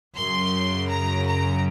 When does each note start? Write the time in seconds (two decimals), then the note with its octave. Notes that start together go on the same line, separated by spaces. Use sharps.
0.18 F#2 C#3 F#3 C6
0.91 A#5
1.28 A#5